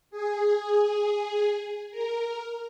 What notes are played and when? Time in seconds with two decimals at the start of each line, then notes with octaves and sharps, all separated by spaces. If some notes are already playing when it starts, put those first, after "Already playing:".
0.11 G#4
1.91 A#4